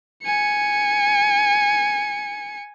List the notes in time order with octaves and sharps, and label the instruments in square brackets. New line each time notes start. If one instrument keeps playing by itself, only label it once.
[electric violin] G#5 C#7